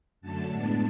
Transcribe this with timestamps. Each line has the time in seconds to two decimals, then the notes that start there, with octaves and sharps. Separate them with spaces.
0.21 F#2 D3 F#3 A3 A5
0.51 A2 G#3 B3 D4